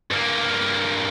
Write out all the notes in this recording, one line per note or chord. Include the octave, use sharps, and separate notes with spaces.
G2 A#3